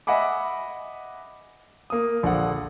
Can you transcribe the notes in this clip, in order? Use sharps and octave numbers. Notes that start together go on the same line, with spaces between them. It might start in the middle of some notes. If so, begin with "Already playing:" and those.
D#5 E5 F#5 G#5 B5 D6
A#3 D#6
A#1 D3 F#5